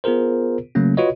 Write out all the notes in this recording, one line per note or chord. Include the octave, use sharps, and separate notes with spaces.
B3 F4 G#4 A#4 C5
C#3 F#3 A3 A#3 C#4
F4 F#4 B4 C#5 D#5